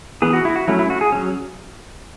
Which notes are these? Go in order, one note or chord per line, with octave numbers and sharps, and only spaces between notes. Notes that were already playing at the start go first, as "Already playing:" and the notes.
E3 B3 G#4
F#4
E4
F#4
F#3 A3 C#4 E4
E4
F#4
G#4
F#3 C#4